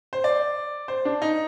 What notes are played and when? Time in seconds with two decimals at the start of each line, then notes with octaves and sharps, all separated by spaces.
0.13 C5
0.24 D5
0.88 C5
1.05 D4
1.22 D#4